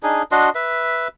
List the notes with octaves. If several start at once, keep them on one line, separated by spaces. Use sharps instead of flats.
D4 D#4 G#4
D4 F#4 D#5 C6
B4 E5